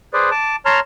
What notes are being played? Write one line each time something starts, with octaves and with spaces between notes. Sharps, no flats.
G#4 B4 C5 D5
A5 D6
C#5 A5 A#5 C6 F6